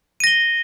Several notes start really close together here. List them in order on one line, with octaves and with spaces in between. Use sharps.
D#7 A#6 G7